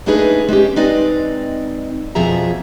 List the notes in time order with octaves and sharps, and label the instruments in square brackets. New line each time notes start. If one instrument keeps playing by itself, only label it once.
[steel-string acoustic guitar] A3 A#3 D4 D#4 G#4 B4
G#3 C4 C#4 G4
G#3 C4 D#4 B4 D5 D#5
F2 B2 F3 G#4 E5 A#5